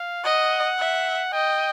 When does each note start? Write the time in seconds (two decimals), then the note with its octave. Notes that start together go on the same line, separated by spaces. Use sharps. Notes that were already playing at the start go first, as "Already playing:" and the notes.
Already playing: F5
0.24 D#5 F#5
0.79 E5
1.33 D#5 G5